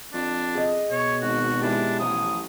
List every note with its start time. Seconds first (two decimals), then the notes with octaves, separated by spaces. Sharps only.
0.14 F2 D4
0.55 G#4 D#5
0.91 B2 C#5
1.22 G#1 F#4
1.62 G#3 D4 E4 G4
2.00 A1 F3 F#3 D#6